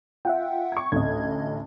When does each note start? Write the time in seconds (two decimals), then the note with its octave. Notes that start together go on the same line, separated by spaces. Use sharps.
0.25 F4 E5 F#5 G5
0.72 C#6 G#6
0.92 A1 D2 D#5 G#6